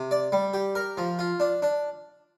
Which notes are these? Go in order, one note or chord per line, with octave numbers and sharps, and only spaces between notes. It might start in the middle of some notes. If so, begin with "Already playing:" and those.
Already playing: C3
D5
G3
G4
A#4
F3
F4
D4
D4